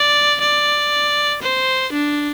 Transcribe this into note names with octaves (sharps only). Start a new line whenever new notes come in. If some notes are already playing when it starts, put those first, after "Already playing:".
Already playing: D5
D5
C5
D4